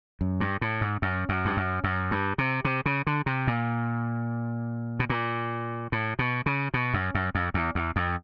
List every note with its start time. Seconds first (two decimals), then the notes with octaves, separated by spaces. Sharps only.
0.21 F#2
0.40 G2
0.61 A2
0.81 G#2
1.02 F#2
1.29 F#2
1.45 G2
1.57 F#2
1.84 F#2
2.11 G2
2.38 C3
2.65 C3
2.86 C#3
3.07 D3
3.26 C3
3.47 A#2
5.00 B2
5.10 A#2
5.92 A2
6.19 B2
6.46 C#3
6.74 B2
6.94 F#2
7.15 F#2
7.35 F2
7.54 E2
7.75 E2
7.96 F2